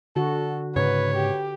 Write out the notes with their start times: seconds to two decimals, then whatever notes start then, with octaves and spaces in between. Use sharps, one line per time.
0.16 D3 F#4 A4
0.76 G#2 C#3 B4 C#5
1.16 G4